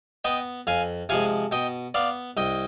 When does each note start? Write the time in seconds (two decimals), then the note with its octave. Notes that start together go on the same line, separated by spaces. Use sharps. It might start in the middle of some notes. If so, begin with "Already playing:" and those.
0.25 B3 D#5 G5
0.67 F2 F5 G#5
1.09 C3 F3 G#3 F5 G#5
1.51 B2 D#5 G5
1.94 B3 D5 F5
2.37 C2 D#5 G5